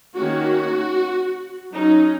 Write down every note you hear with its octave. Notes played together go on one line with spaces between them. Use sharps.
D#3 A#3 C#4 F#4
F#3 C#4 D#4